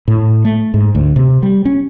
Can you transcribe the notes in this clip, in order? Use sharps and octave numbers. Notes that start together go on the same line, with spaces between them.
A2
A3
G#2
D2
C3
G3
C#4